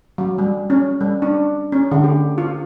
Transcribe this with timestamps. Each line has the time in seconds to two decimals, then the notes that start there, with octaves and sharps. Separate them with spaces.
0.18 F#3
0.38 G3
0.70 C#4
1.01 G3
1.22 D4
1.72 C#4
1.92 D3
2.04 G4
2.38 F4